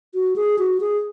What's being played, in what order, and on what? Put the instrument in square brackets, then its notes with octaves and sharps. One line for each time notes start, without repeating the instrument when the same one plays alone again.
[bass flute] F#4
G#4
F#4
G#4